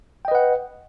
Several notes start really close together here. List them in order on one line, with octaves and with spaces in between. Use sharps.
G5 D#5 B4 F#5